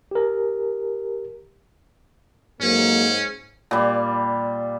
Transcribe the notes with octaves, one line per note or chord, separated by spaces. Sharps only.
G4 A#4
F2 G#2 F#3 A#3 C#4
A#2 G3